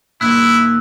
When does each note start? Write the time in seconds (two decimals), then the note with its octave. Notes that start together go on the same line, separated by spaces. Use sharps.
0.21 A#2 D#3 A#3 E4 E6 F#6 B6